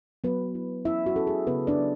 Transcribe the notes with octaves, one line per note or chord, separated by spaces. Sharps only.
F#3 B3 B4
E4
C#4 E4 E5
F#4
C#4 A4
G#4
C#3 B3 B4
D4 D5
F#3